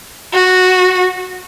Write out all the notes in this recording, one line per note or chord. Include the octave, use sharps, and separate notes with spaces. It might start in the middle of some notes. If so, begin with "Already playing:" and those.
F#4